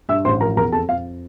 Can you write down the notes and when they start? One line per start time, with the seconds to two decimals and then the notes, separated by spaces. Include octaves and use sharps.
0.09 G2 E5 E6
0.25 A1 C5 C6
0.41 F3 A#4 A#5
0.57 E2 A#4 A#5
0.72 F2 A4 A5
0.89 F2 F5